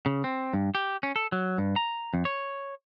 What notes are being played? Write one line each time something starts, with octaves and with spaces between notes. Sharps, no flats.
C#3
C4
G2
G4
C#4
A4
F#3
G2
A#5
F2
C#5